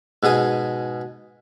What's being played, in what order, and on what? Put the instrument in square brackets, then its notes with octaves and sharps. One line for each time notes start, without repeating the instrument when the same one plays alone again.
[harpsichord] G#2 B2 G#4 D#6